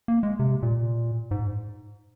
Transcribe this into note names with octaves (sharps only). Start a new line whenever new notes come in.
A#3
G#3
C3
A#2
G#2